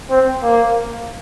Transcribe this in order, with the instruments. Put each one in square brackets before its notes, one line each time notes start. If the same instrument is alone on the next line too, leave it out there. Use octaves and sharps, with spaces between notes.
[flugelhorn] C4
A#3